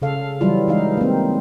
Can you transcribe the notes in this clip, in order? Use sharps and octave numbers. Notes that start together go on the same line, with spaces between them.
C#3 A4 F5
E3 F#3 G3 E4 F4
E3 G#3 D#4 F5
A#3 C4